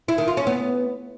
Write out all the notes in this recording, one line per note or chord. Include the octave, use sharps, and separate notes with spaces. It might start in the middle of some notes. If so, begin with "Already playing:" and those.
E4
D#3
F4
C#4
B3